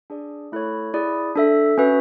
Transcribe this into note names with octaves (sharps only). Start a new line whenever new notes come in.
D4 G#4 D5
A3 E4 A4 C#5
E4 G#4 D5
D4 A4 E5
C#4 F#4 B4 E5